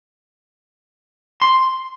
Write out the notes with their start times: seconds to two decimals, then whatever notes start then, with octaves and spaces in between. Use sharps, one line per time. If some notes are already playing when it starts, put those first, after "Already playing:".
1.42 C6